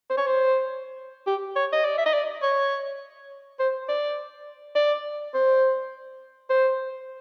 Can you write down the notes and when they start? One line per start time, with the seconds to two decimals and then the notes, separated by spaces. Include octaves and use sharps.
0.10 C5
0.18 C#5
0.27 C5
1.27 G4
1.56 C#5
1.73 D#5
1.85 D5
1.98 E5
2.06 D#5
2.14 D5
2.42 C#5
3.59 C5
3.89 D5
4.76 D5
5.34 C5
6.50 C5